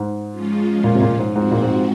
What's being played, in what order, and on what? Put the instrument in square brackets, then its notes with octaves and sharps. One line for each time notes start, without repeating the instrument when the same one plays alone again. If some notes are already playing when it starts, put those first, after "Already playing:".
Already playing: [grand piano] G#2
[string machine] F3 G#3 C#4 F4
[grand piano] A#2
C3
A#2
G#2
[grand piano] G#2 [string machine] F3 G#3 C4 F#4
[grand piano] A#2
G#2